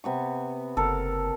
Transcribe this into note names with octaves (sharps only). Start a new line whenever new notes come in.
C3 B3 C#6
F#1 A4 A#4